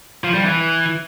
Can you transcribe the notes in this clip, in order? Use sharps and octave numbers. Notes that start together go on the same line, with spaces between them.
F3
G3
E3